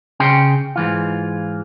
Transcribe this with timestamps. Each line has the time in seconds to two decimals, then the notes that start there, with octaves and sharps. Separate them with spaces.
0.20 C#3 C#4 G5 C6
0.76 G#2 E3 F4